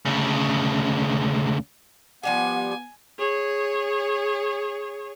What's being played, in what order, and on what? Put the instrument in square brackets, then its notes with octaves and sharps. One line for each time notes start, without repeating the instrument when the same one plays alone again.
[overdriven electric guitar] D2 C#3
[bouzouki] F3 G3 G4 [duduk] B3 [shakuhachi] F#5 [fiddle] G#5
[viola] G#4 C#5